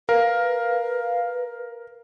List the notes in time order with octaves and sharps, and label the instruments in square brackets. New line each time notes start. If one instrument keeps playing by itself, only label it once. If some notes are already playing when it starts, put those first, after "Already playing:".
[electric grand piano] A#4 [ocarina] B4 [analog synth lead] F5